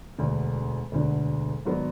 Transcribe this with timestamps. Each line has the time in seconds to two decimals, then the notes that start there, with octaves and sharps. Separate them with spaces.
0.18 E1 D2 D3
0.92 E1 D2 D3
1.65 G#1 F#3 B3 D4